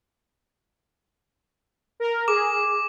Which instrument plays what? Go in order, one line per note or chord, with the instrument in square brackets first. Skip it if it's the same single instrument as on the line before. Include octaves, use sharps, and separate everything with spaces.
[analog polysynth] A#4
[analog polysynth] G#4 [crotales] D6